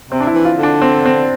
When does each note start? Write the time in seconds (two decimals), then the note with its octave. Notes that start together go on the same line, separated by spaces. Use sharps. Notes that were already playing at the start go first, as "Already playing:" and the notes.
0.10 C3 C4
0.20 D4
0.27 E4
0.34 E3
0.45 F4
0.57 D3
0.63 D4
0.82 C4
1.06 C4